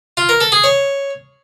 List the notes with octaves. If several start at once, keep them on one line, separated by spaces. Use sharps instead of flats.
F4
A#4
A4
G#4
C#5